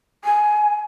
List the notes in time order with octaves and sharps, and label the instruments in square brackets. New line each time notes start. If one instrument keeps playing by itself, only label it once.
[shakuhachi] G#5